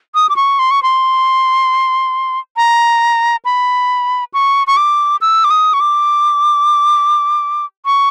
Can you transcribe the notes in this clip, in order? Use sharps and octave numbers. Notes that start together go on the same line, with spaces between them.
D#6
D6
C#6
C6
C#6
C6
A#5
B5
C#6
C#6
D6
E6
D6
D#6
C#6
D6
C#6